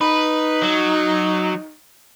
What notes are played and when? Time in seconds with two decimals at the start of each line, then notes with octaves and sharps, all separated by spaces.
0.01 D#4 B4
0.63 F#3